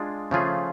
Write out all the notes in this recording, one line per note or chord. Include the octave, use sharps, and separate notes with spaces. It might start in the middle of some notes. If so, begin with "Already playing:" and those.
Already playing: G#3 D4 F4 G#4
C#3 F3 A3 F4 G#4